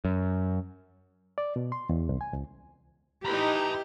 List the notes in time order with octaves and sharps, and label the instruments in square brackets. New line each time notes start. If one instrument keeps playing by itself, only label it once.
[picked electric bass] F#2
[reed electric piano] D5
B2
C6
E2
C2
G#5
C#2
[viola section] D#4 E4 B4 [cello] G4 [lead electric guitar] A#5 B5